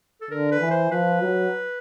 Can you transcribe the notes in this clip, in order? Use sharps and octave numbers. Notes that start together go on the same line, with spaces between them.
A4
D3 A#4
B4
E3
C5
F3 B4
F#3